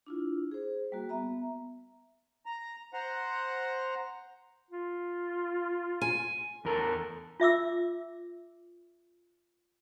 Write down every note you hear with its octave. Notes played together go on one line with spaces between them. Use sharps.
D4 E4 F4
G#4 C5
G3 A#3 F#4
B3 E5 A#5
A#5
C5 F#5 A#5
F4
G#5
E2 A4 A#4
F4 E5 D6 E6